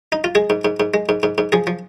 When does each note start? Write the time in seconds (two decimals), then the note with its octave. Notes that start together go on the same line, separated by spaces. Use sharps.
0.12 D#4
0.24 F4
0.35 G#3 G#4
0.50 G#2
0.65 G#2
0.80 G#2
0.94 G#3
1.09 G#2
1.23 G#2
1.38 G#2
1.52 F3 G#4
1.67 F3